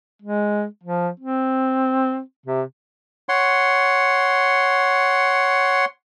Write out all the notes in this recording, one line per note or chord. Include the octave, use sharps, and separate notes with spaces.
G#3
F3
C4
C3
C#5 F#5 C6